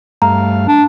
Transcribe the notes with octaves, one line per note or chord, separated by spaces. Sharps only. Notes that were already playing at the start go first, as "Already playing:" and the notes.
G2 A3 F5 A#5
D4